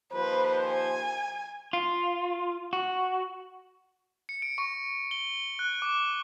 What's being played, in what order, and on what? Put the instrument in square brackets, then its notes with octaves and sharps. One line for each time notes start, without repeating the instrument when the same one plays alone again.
[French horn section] D#2 F3 C5 [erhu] B4
[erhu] G#5
[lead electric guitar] F4
F#4
[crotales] C#7
D7
C#6
G7
F#6
D6